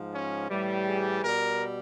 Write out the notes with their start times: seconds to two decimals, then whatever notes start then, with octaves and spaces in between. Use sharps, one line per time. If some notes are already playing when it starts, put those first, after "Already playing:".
Already playing: G#2 F3
0.13 C#4
0.50 A2 E3 G3
0.87 G#4
1.24 B2 G3 A#4